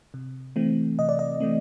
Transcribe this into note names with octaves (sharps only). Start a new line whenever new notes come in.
C3
E3 A3 C4
C3 D#5
D5
D#5
E3 A3 C4